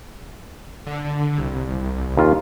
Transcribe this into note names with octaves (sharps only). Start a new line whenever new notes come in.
D3
C2
D#2 F4